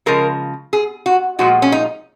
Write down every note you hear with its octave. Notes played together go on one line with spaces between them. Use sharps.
C#3 F3 G#3 A#4
G#4
F#4
A#2 F3 G#3 F#4
C#4
D#4